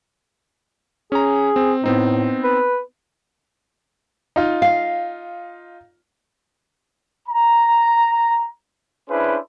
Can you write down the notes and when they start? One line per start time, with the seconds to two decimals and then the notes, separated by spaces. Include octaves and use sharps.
1.12 C#4 G#4 A#5
1.56 C4
1.84 A2 B3 C4 D#4
2.44 B4
4.36 D#4 F4
4.62 F5
7.28 A#5
9.09 C#4 D4 E4 G#4 B4 C5